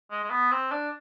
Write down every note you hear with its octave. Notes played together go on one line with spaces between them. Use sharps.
G#3
G#3
B3
C4
D4